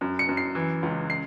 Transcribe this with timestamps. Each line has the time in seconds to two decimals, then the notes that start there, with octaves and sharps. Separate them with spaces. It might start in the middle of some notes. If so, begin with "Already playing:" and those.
0.01 F#2
0.19 C#7
0.28 F#2
0.37 C7
0.55 E3
0.83 C#2
1.10 C7